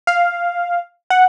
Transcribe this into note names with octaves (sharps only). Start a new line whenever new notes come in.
F5
F#5